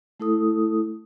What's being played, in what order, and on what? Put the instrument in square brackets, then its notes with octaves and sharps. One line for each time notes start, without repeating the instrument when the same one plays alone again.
[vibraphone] A3 E4 A4 D#6